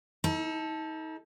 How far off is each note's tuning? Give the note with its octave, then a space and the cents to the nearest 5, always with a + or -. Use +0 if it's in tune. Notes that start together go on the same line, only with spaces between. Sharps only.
D#4 +35 A4 +0